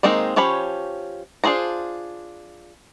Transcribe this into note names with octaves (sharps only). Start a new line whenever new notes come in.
D#3 G#3 A#3 C4 D#4
F3 C#4 G4 C#5 B5
D4 F4 G#4 C5 A#5